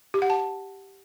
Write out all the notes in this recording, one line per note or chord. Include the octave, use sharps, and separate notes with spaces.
G4
F#5
A5